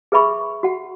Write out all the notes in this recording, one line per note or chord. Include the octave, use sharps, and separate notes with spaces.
G#4 B4 E5 B5 C#6
F#4 F#5